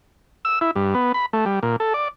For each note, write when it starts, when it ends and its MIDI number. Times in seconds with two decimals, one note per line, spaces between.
0.45 0.59 88
0.61 0.71 64
0.76 0.94 43
0.95 1.12 59
1.14 1.26 83
1.33 1.45 57
1.46 1.59 55
1.63 1.76 46
1.80 1.93 69
1.94 2.08 74